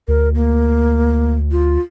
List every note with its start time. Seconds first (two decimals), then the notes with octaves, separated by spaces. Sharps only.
0.08 D2 A#4
0.34 A#3
1.51 F4